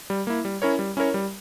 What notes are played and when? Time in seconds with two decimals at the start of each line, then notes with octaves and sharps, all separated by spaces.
0.10 G3
0.27 A#3 E4
0.45 G3
0.62 C#4 E4 A#4 C#5
0.79 G3
0.97 C#4 E4 A#4 C#5
1.14 G3